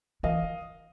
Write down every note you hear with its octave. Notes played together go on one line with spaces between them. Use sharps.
E3 D#5 F5